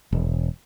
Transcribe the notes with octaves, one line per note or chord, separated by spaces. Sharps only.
E1